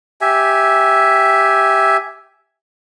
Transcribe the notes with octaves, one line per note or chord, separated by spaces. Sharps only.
G4 E5 G#5